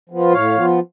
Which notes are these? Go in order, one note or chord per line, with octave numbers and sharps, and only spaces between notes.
F3 B3 F4
A2 C#5 F5
F3 B3 F4